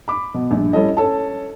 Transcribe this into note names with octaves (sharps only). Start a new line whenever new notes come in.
B5 D6
B2
A#1 G2
G3 C#4 E4 A4 D#5
C#4 A4 A5